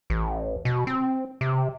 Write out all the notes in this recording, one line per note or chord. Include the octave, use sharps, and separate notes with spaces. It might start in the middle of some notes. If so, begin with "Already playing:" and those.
A1
B2
C4
C3